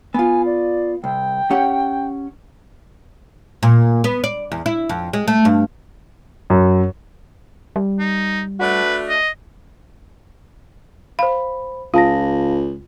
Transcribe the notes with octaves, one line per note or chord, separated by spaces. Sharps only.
B3 F4 G#5
D5
C2 G5
C#4 G4 F#5
A#2
B3
D5
E2
E4
F2
G#3
A3
G2
F#2
G3
D#4
A3 D4 F#4 B4
D#5
C5 F5 B5
C#2 F4 F5 A5 A#6